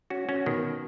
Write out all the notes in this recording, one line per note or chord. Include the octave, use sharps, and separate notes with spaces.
C#4 F#4
C#4 F#4
B2 D#3